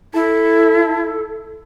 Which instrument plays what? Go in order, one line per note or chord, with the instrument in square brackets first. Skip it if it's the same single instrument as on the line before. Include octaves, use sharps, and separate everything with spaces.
[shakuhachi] E4 [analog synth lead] A4